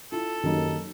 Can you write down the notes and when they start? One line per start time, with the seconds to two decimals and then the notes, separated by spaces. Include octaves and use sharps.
0.12 E4 F4 A4
0.44 F#2 D#3 A#3 D#4 G4